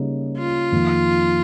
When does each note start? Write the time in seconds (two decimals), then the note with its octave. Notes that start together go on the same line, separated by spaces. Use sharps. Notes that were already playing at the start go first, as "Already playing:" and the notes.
Already playing: C#3 G3 A#3 D#4
0.38 F4
0.72 F2 D#3 A#3 D#4